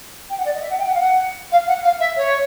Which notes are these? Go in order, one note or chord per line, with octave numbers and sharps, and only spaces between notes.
G5
F#5
D5
D#5
E5
F#5
G5
F#5
F5
F#5
F5
F#5
F5
E5
C#5